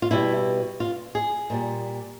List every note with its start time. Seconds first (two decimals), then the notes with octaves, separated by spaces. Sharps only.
0.02 F4
0.11 B2 G3 E4
0.80 F4
1.15 G#4
1.50 A#2 G3